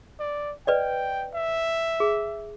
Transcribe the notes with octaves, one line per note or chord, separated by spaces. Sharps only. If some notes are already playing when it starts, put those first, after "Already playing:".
D5
B4 D5 D#5 G5
E5
G#4